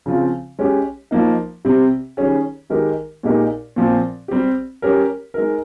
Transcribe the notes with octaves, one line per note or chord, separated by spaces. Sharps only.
C#3 F3 C4 F4
G#3 C#4 G4
F3 A#3 D#4
C3 G3 C4 G4
D#3 G3 C#4 G#4
D#3 G#3 D#4 G4 A#4
A#2 G#3 D#4 G4 A#4
A#2 F3 C4
G3 C4 G4
G3 C#4 G4 A#4
G#3 D#4 A#4